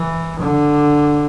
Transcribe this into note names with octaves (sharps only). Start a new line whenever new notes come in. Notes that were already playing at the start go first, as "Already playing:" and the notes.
Already playing: E3
D3